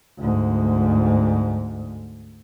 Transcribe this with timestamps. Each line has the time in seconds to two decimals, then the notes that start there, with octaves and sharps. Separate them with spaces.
0.19 D2 G#2